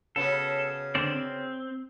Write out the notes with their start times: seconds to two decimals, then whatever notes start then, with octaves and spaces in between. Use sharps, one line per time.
0.16 C#3 B3 F#4 A4
0.95 D3 C4 D5
1.16 C4